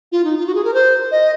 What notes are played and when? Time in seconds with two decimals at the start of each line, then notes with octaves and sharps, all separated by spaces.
0.12 F4
0.25 D#4
0.37 F4
0.47 F#4
0.55 G#4
0.65 A#4
0.74 C5
1.11 D#5